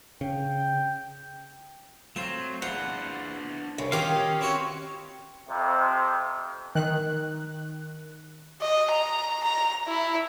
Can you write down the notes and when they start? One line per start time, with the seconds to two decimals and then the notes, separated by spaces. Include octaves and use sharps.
0.21 C#3 G5
2.16 F#3 A3 C4 F4 C5
2.62 E2 D4 F4 C5 F#5
3.78 C2 C#3
3.92 D#3 C#4 F4 G4 D#5 F5 A#5
4.41 C4 E4 F#4 C#5
5.49 F2 C3
6.75 D#3 F#6
8.62 D#5
8.91 A#5
9.43 A#5
9.88 E4